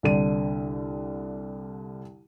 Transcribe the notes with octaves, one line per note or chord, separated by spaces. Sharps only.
C2 D3 D#7